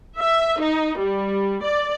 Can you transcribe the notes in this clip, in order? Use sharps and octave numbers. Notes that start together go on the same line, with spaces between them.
E5
D#4
G3
D5